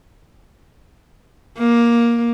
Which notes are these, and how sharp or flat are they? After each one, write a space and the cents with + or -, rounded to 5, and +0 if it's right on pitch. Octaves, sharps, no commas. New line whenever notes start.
A#3 +10